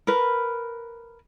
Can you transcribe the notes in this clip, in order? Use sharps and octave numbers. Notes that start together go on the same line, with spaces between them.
A#4 B4